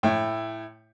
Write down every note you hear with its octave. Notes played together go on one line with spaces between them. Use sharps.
A2 E4 G5